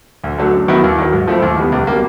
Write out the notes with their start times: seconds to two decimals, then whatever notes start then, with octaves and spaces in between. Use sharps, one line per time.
0.24 D2
0.38 D3 F#3 A3
0.53 F#2
0.68 D#3 F#3 B3 E4
0.84 D#2
0.98 D#3 F#3
1.13 G#2
1.27 F3 A3 C4 E4
1.42 D#2
1.57 D#3 G3 B3
1.72 C#2
1.87 B2 G3 A#3